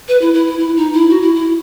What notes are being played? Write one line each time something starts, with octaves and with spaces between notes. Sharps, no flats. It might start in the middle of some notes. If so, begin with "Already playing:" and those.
B4
E4
E4
E4
E4
D#4
E4
F#4
E4
E4